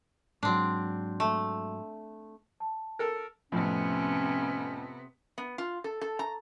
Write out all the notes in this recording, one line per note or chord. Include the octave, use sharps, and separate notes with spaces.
G#2 F#3 C4 D4
A3
A5
A4 A#4
F2 A2 C3 B3 C#4
B3
F4
A4
A4
A#5